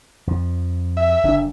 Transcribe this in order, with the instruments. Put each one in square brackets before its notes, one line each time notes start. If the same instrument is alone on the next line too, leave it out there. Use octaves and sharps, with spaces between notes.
[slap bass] F2 F3
[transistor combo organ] E5
[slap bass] F#1 D3 D4